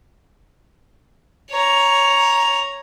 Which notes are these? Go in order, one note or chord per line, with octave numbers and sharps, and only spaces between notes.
C#5 A#5